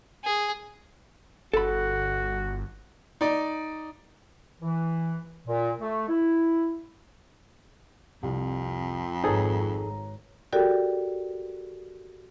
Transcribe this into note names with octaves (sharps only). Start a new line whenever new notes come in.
G#4
G1 F#4 A4 B5
D#4 D5
E3
A#2
A3
E4
C2 F2
G#1 D#4 G#4 A4 B4 C#5 A#5
F#4 G4 A4 A#4 D5 G5